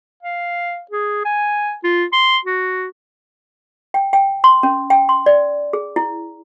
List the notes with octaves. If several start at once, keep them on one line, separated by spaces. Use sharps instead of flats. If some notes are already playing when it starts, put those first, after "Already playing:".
F5
G#4
G#5
F4
C6
F#4
G5
G5
C6
C#4
G5
C6
D5
G#4
E4